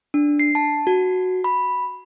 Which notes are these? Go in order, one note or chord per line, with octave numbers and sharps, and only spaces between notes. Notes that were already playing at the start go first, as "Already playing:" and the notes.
D4
C7
A5
F#4
B5